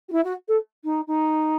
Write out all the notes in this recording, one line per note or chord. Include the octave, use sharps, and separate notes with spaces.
F#4
E4
F#4
A4
D#4
D#4